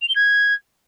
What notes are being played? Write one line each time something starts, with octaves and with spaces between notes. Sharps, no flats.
F7
G7
G#6